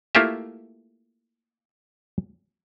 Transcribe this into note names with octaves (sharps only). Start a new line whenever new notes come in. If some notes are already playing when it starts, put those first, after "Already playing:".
A3 A#3 E4 F4 G4 E5